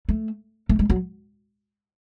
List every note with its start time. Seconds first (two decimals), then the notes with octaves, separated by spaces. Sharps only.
0.09 A3
0.69 A3
0.79 G#3
0.90 F#3